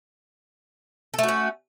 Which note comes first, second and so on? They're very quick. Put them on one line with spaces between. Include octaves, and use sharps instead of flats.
A4 A3 F#4 C#4